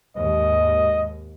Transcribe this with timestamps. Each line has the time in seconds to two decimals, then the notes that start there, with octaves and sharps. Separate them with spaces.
0.17 D#2 G#2 D#5